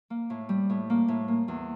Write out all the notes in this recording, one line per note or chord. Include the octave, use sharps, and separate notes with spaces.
A#3
A2
G3
A2
A#3
A2
A#3
E2